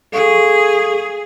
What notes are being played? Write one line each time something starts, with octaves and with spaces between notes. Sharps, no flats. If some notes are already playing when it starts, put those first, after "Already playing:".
G#4 A4 F5 C#6